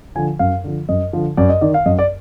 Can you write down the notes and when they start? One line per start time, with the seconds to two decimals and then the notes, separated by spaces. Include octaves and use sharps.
0.15 D3 F3 G#5
0.39 F#2 F5
0.64 D3 F3
0.89 F#2 D#5
1.13 D3 F3
1.37 F#2 D5
1.50 D#5
1.61 D#3 D5
1.74 F5
1.86 F#2 D#5
1.99 D5